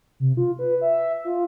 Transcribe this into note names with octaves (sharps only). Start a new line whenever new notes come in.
C3
F4
B4
E5
F4